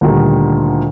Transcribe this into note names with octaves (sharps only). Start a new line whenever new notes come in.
D2 A#2 D3 D#3 G3